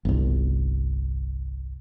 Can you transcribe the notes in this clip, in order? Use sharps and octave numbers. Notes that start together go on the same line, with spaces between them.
G1 C2